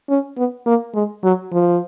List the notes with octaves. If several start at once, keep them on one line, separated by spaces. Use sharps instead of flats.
C#4
B3
A#3
G#3
F#3
F3